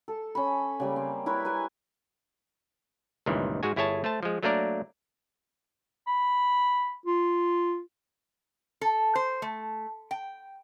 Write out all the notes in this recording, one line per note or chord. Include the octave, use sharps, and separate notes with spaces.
A4
C#4 B5
C#3 G3 A#3
C4
E4 A#4 B4 C#5
B4 G#5
C#2 G2 A#2 D#3 E3
G#2 G#3 F#4 G#5
G1 E4 G#4 C#5 G#5 A5
A3 C5 A5
F3 G#3
F#3 A3 A#3 D4 A#4 D5
B5
F4
A4
C5
A3
G5